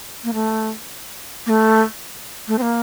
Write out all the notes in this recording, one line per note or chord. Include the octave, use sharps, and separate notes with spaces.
A#3
A3
A#3
A3
A3
C4
A#3